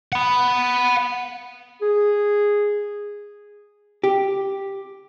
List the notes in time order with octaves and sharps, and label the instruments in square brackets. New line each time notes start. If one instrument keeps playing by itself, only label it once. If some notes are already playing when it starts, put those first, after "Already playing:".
[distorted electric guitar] F#5 B5
[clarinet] G#4
[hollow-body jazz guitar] G4